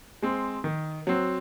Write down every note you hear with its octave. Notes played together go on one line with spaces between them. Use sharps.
G#3 C4
D#3
F#3 C4